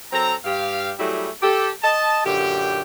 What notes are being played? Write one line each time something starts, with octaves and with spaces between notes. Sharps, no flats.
F#3 C4 A4 A#5
G2 G4 F5
F#3 G3 A3 E4 G4 G#4
G4 A4
D#5 A5
F#2 A#2 D3 G4